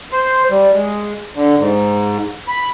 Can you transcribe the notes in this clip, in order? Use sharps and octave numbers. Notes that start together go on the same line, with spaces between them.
C5
G3
G#3
D3
G#2
B5